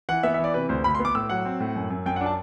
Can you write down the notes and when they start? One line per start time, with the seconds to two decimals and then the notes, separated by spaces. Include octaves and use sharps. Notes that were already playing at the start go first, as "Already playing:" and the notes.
0.09 E3 F#5
0.23 B3 E5
0.34 E5
0.39 E3 D5
0.54 C3 B4
0.69 D2 C5
0.84 D2 B5
0.95 C6
1.00 B3
1.05 D6
1.15 A2 E6
1.29 F#3 F#5
1.45 C4
1.60 A2
1.76 F#2
1.90 F#2
2.06 F#2 G5
2.16 F#5
2.21 D4
2.26 A5